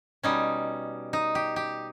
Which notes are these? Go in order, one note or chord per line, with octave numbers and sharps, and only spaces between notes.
B2 G3 C#4 D#4
D#4
G4
G4